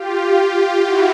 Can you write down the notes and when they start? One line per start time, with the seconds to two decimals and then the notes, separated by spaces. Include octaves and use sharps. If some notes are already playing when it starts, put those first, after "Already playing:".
Already playing: F4 G4
0.20 F4 G4
0.82 E4 F#4